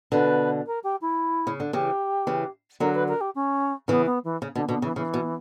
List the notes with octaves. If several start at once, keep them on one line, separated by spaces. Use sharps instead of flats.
B2 D3 B4
A#4
G4
E4
C#3
D3
C#3 E3 G4
C#3 E3
D3 F#3 A#4
B4
A#4
G4
C#4
C#3 E3 B3
B3
E3
C#3
B2 D3
B2 D3
C#3 E3
C#3 E3
B2